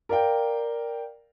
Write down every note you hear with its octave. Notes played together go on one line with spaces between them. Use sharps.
A#4 D5 F5 G5